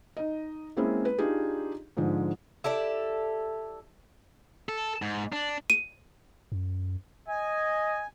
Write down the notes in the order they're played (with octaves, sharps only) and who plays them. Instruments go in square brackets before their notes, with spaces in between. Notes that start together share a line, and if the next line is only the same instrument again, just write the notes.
[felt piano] D#4 D#5
G#3 A#3 C4 C#4 E4 G#4
B4
D4 D#4 F4 G4 G#4
G#2 D3 F3 G#3
[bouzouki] E4 G4 A4 D5
[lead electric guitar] A4
G#2
D4
[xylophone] D#7
[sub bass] F#2
[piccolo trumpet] D#5 [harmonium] G#5